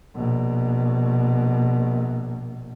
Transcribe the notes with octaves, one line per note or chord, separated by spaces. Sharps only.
A#1 B2